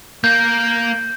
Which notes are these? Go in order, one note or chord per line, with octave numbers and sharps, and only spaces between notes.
A#3 G6